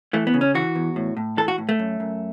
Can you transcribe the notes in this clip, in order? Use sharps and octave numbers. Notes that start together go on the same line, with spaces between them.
E3 A3
B3
C#3
C#4
E3 F#4
E2
A2
A2
E3 A4
F#4
A2
A3
F#2
F#2